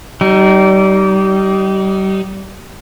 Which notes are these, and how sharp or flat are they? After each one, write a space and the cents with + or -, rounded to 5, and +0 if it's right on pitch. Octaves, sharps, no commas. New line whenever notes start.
G3 -30 D#4 +0